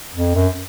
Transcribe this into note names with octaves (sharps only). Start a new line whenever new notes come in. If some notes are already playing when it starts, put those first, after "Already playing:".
F2
F#2